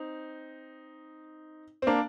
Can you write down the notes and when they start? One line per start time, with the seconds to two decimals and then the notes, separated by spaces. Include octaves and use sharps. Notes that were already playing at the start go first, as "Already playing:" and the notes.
Already playing: C4 D#4
1.82 C4
1.87 A#3 D4